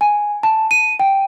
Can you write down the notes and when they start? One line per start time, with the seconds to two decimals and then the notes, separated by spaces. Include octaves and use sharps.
0.01 G#5
0.43 A5
0.71 D#7
1.00 G5